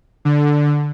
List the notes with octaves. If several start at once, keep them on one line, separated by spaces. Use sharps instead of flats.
D3